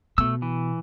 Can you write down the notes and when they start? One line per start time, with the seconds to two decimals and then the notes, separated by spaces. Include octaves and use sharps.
0.18 B2 A3 E6
0.42 E3